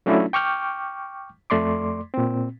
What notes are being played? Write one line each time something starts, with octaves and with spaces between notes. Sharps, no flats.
F#3 A3 C#4 D4 E4 F4
G5 C#6 D6 F6 G6
F2 A3 D5 C6 D6
A#2 C4